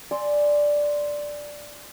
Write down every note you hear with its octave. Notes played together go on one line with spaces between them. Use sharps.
D5 G#5 C6 E6